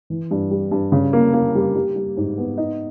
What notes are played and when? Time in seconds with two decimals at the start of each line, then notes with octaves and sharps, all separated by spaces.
0.10 E3
0.31 G2
0.51 G3
0.71 G2
0.92 C#3
1.13 A#3
1.33 A#3
1.55 G3
1.75 G3
1.96 G3
2.17 G#2
2.38 B3
2.58 D#4